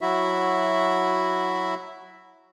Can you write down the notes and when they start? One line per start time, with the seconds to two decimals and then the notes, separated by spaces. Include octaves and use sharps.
0.01 F#3 E4 F#4 E5